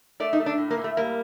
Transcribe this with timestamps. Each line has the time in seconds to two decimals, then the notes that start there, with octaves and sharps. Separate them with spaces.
0.20 A3 D5
0.33 D#4
0.40 A3
0.46 D4
0.58 A2
0.71 A#3
0.77 A2
0.84 A3
0.97 G3 A#3